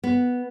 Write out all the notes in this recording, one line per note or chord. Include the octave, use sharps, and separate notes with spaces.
B3